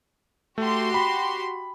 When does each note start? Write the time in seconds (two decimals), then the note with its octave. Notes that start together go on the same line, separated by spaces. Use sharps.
0.58 A3 F#4 G4 C6
0.94 B5